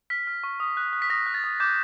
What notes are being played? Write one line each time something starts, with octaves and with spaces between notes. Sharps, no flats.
F6 B6
F6
C#6
D#6
F#6
F#6
B6
D#6 A#6
F#6
A6
D#6
D6 G6